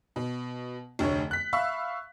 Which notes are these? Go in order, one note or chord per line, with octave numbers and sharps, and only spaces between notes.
B2
F1 D2 D3 C#5
F#6 B6
E5 F5 B5 C#6 E6